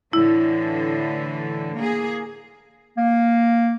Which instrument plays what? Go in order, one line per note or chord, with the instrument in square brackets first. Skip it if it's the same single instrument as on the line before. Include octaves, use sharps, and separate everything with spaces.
[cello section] A2 D3 E3 [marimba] E4
[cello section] A#3 G#4
[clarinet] A#3